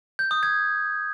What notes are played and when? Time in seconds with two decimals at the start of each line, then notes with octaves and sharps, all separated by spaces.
0.19 G6
0.31 D#6
0.43 G#6